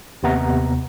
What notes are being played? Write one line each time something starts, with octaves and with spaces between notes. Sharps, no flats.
D#2 C3 B3 F#5 A#5